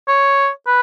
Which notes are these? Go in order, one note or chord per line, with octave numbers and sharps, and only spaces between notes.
C#5
B4